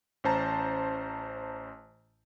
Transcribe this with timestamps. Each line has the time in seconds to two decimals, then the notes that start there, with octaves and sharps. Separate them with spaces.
0.24 A1 C#4 C5 A5 A#5